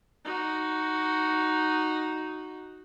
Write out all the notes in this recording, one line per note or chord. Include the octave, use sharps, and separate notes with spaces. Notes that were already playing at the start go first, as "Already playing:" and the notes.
D#4 F#4